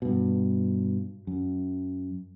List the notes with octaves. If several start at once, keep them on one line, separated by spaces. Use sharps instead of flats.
G2 B2
F#2